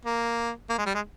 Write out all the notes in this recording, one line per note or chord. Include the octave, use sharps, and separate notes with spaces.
A#3
A#3
G#3
G3
G#3